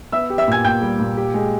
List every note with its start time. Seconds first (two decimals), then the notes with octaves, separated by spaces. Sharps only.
0.12 B3 E5 E6
0.30 G4
0.38 E5 E6
0.48 A#2 G#5 G#6
0.64 A#2 G5 G6
0.82 G3
0.99 A#2
1.17 G4
1.34 G#3